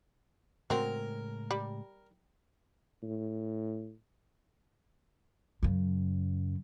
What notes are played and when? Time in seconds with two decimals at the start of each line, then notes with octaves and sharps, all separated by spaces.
0.70 A2 C#3 F#3 G#3 C4 A#4
1.51 G3
3.03 A2
5.63 F#2 C#3